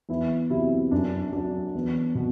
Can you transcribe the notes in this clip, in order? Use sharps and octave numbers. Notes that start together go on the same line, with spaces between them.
E2 E4
C3 F#3 E4
F#2 D4
F#3 D4
E2
B2